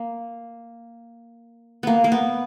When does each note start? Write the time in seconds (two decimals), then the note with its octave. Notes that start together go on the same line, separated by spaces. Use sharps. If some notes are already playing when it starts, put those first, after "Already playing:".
Already playing: A#3
1.83 A#3 B3
2.04 A#3
2.12 B3